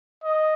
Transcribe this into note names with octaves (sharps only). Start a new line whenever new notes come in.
D#5